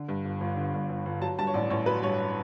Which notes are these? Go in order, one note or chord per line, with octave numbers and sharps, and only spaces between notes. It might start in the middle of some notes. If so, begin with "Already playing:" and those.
Already playing: D3
G2
G1
G1
D3
G2
G1
G1
F#3 A5
G2 A5
C#5
A1 D5
A1 C#5
F#3 B4
G2 C#5